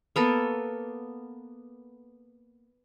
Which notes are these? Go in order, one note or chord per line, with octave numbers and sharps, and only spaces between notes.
A#3 B3 A4